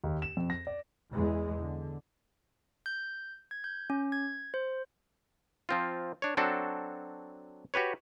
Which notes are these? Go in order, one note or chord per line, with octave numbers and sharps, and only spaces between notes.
D#2
E7
F2
A#6
D5
E2 E3 G#3
D3
G6
G#6
G6
C#4
G#6
C5
F3 C4 F4
D4 C#5
F#3 C4 D4 F#4 A4
F#4 G4 B4 C#5